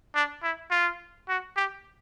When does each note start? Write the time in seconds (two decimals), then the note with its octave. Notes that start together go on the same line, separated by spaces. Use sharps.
0.15 D4
0.43 E4
0.71 F4
1.29 F#4
1.57 G4